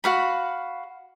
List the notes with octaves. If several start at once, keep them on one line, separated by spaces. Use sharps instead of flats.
F#4 F5 B5